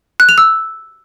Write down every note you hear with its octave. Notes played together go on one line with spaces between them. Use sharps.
F#6
F7
E6